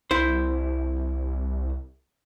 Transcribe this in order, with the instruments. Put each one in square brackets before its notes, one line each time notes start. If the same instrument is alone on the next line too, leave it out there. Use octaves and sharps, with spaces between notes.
[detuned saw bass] C2 [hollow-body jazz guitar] E4 C5